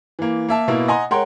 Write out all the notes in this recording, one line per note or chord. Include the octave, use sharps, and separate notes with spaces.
E3 A#3
A#3 E5 A5
B2 A#3 E4
D#5 F#5 G#5 A#5 C6
G#3 A#4 C#5 F#5 G5 C6